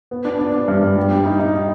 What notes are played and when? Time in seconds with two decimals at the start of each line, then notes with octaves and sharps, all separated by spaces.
0.11 B3
0.25 D4
0.39 D4
0.53 D4
0.68 G2
0.83 G2
0.96 G3
1.11 G3
1.25 D#4
1.39 D#4
1.54 D#4